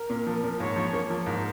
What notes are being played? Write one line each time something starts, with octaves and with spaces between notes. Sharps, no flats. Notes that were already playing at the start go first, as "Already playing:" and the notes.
Already playing: A#4
A#2
F3
A#2
G#2 C#5
F3
A#3
F3 A#4
G#2